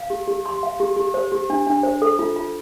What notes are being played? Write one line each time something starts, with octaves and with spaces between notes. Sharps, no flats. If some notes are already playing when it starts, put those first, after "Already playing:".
Already playing: F5
G4
G4
C6
F5
G4
G4
C5
G4
D4
D4
C5
A4
F4
F4